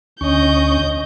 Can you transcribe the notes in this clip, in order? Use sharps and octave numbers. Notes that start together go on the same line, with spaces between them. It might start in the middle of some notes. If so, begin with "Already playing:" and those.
D2 C#4 D#5 C#6 G6